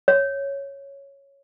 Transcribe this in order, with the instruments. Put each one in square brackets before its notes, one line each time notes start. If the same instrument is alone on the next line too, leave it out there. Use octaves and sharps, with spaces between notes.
[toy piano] C#5